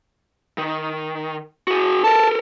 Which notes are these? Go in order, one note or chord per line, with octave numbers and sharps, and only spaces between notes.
D#3
F#4 G#4
A4 A#4 A5